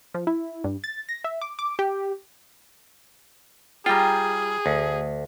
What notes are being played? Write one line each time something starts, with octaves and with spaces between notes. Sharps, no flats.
F3
E4
G2
A6
A#6
E5
D6
D6
G4
G3 F4 G#4 G5 A#5
D2